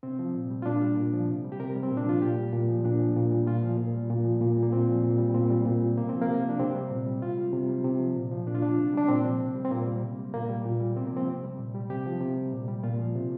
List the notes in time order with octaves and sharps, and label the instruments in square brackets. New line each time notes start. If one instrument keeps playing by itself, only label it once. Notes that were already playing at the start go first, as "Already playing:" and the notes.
[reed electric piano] C3 C4
F3
A#2
G3
F4
A#2 D4
G3
A#2
F3
C3
G3
G4
C3 A#4
G3
C4
A#2
D4
F3 F4
A#2 G4
G3
A#2
F3
A#2 D4
F3
A#2
G3
A#2 F4
F3
A#2
G3
A#2
F3
A#2
G3
A#3
A#2 C4
F3
A#2
G3
A#2 C4
G3
A#2
G3
C3 A#3
F3 C4
A#3
C3
F3
D4
C3 C4
G3
A#2
G3
C3 F4
G3
C3
G3
C3
F3
A#2
F3
A#2 D4
F4
F3 D4
C3
G3 D4
A#2 C4
F3
C3
G3
C4
A#2 A#3
G3
C3
G3
A#2 A#3
G3
A#2
G3
C3 C4
A#3
F3 C4
C3
G3
A#2
G3
C3 G4
F3
C3
G3
A#2
G3
A#2 F4
F3
C3